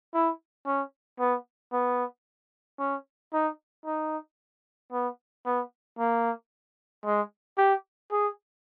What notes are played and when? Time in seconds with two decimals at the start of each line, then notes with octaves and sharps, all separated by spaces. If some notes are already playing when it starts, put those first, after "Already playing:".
0.14 E4
0.66 C#4
1.19 B3
1.72 B3
2.79 C#4
3.33 D#4
3.85 D#4
4.92 B3
5.45 B3
5.99 A#3
7.05 G#3
7.58 G4
8.11 G#4